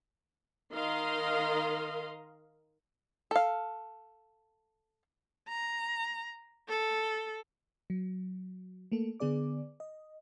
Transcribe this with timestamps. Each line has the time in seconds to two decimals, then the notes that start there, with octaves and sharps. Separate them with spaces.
0.73 D#3 A#4 D#5 F5 C6
3.31 A4 F5
5.48 A#5
6.69 A4
7.90 F#3
8.92 A3 A#3 A4
9.20 D3 B3 G#4 D5 D6
9.80 D#5